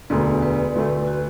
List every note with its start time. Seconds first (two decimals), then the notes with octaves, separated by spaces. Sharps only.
0.10 E1 D2 D3 B4
0.27 D5
0.43 B4
0.75 D2 D3 A3
1.07 F#4